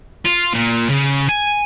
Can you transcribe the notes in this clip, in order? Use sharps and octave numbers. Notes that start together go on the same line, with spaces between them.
F4
A#2
C#3
G#5